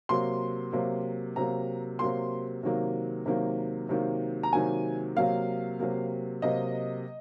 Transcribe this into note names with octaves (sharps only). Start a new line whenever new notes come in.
C3 F#3 A#3 C6
C3 F#3 A#3
C3 F#3 A#3 A#5
C3 F#3 A#3 C6
C3 D#3 F#3 A#3
C3 D#3 F#3 A#3
C3 D#3 F#3 A#3
A#5
C3 D#3 F#3 A#3 G#5
C3 F#3 A#3 F5
C3 F#3 A#3
C3 F#3 A#3 D#5